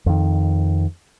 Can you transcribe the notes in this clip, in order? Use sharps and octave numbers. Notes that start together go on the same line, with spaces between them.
F2 D#3